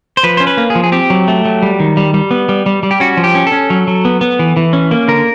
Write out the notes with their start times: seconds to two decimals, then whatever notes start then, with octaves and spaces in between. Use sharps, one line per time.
0.17 C5
0.23 F3 B4
0.37 C#4 C5
0.47 B4
0.57 A#3
0.70 G#4
0.75 F3
0.84 G#4
0.92 C4 G4
1.10 F#3
1.28 A3
1.45 F#3
1.63 G3
1.80 D#3
1.97 G3
2.14 G3
2.31 B3
2.49 G3
2.66 G3
2.83 G3
2.91 G4
3.00 C#4 F#4
3.17 F3
3.24 G4
3.35 C#4
3.47 A4
3.52 C#4
3.70 F#3
3.87 F#3
4.05 B3
4.21 B3
4.39 E3
4.57 E3
4.73 C#4
4.91 A#3
5.08 D3 A#4